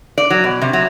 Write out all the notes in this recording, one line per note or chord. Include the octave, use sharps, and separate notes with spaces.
D5
F#3
B2
C3
F#3